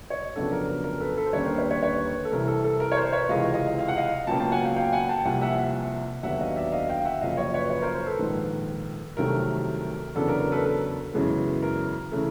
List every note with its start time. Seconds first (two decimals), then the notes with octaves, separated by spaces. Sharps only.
0.10 C#5 D#5
0.35 F2 C#3 F#3 B3 D4 A4
0.52 A#4
0.68 A#4
0.84 A#4
1.00 A4 B4
1.16 A4 B4
1.26 C5
1.33 D#2 D3 G3 A#3 C#4 B4 C#5
1.45 A#4 C5
1.58 B4 C#5
1.70 B4 C#5
1.82 B4 C#5
2.25 A4
2.32 C2 C3 E3 A#4
2.48 A4
2.64 A4
2.80 A#4
2.92 C#5
2.97 A#4 C5
3.12 B4 C#5
3.29 C#2 C3 E3 G#3 D#5 F5
3.54 D#5 F5
3.79 F5
3.88 F#5
3.97 D#5 F5
4.27 C#2 B2 F#3 A#3 C#4 G5 A5
4.40 G5 A5
4.52 F#5 G#5
4.64 F5 G5
4.76 F5 G5
4.92 F#5 G#5
5.09 G5 A5
5.25 C2 C3 F3 A#3 F#5 G#5
5.41 E5 F#5
5.58 E5 F#5
6.23 D#2 D3 F#3 B3 D4 E5 F#5
6.39 D#5 F5
6.56 D5 E5
6.72 D#5 F5
6.89 F5 G5
6.99 F5
7.05 E5 F#5
7.21 F#2 C#3 F3 A#3 D#5 F5
7.37 C#5 D#5
7.54 B4 C#5
7.70 B4 C#5
7.82 A#4 C5
7.94 A#4 C5
8.07 A4 B4
8.19 A#1 G#2 D#3
9.17 C2 C3 D#3 F#3 A3 A#4
10.15 E2 C#3 F#3 B3 D4 A4
10.28 A#4
10.40 A#4
10.52 A4 B4
10.59 A#4
10.65 A4
11.13 F#2 C#3 E3 G#3 B3
11.63 A#4
12.11 C#3 E3 A3